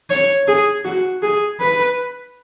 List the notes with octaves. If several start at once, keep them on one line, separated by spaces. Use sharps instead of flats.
C#5
G#4
F#4
G#4
B4